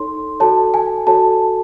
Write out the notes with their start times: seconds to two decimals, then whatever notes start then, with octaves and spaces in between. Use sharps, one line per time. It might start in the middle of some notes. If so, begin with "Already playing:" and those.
Already playing: D#4 A4 C#5 C6
0.40 F#4 A4 C#5 A5
0.74 G#5
1.07 F#4 A4 C#5 A5